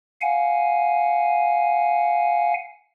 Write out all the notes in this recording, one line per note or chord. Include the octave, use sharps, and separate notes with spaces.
F5 F#5 G#5